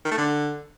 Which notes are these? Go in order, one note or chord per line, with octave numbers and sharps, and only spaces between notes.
D#3
A3
D3